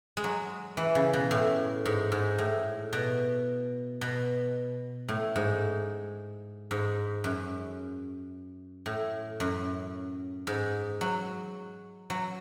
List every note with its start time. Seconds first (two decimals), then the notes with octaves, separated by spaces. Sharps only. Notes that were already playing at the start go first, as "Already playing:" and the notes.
0.17 G#3
0.24 F#3
0.77 E3
0.95 C#3
1.13 B2
1.31 A2
1.85 G#2
2.12 G#2
2.38 A2
2.93 B2
4.01 B2
5.08 A2
5.36 G#2
6.71 G#2
7.24 F#2
8.86 A2
9.40 F#2
10.47 G#2
11.01 F#3
12.10 F#3